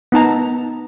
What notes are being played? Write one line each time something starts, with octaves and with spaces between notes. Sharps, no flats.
B3 D#4 A5 A#5